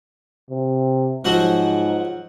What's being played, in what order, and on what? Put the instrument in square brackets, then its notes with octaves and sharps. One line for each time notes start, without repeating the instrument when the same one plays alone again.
[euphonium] C3
[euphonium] G#2 [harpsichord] F3 F#3 F#4